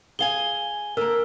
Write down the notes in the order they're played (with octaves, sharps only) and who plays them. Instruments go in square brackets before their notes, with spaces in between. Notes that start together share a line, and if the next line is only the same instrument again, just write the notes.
[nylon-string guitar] G#4 F5 G#5 [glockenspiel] G7
[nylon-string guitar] D3 A#3 [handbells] A#4 E6